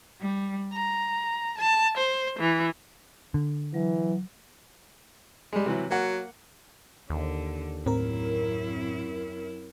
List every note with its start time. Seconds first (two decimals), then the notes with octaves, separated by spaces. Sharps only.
0.21 G3
0.74 A#5
1.58 A5
1.98 C5
2.39 E3
3.34 D3
3.74 E3 F#3
5.53 G3 G#3
5.66 C3 E3 F#3
5.90 F#3 A#3 F#5
7.10 D#2 D3
7.86 F#2 A2 C4 E4 A#4